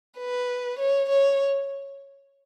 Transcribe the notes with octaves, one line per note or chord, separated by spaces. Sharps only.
B4
C#5
C#5